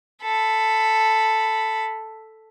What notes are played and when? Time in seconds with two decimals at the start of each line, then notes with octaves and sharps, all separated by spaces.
0.23 A4 B5